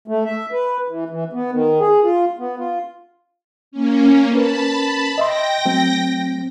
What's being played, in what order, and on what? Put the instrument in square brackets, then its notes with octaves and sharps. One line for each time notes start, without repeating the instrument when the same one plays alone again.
[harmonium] A3
E5
B4
E3
E3
B3
D#3
G#4
F4
B3
F4
[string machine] A#3 C#4
[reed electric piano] C#4 A#4 B4 [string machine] A5 B5
[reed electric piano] D#5 E5 C6 [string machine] G5 A#6
[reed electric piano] F#3 A3 C4